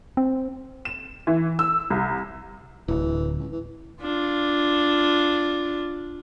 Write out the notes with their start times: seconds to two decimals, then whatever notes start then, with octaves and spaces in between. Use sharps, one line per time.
0.17 C4
0.85 E7
1.27 E3
1.59 E6
1.90 C2
2.88 D1 E3
3.38 C#2
3.52 E3
4.01 D4 F4